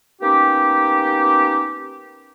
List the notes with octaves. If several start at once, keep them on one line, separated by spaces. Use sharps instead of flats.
A#3 B3 C#4 D#4 G4